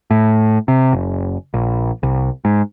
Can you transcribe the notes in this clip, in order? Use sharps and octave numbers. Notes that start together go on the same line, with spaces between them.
A2
C3
F#1
A#1
C2
G#2